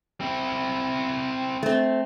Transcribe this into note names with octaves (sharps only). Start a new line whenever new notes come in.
C4 E4
A3 C4